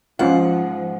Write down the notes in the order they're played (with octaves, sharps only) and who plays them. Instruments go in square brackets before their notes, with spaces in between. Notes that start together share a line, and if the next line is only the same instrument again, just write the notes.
[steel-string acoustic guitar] G#2 F#5 [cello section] F3 [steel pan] C#4 F4 F5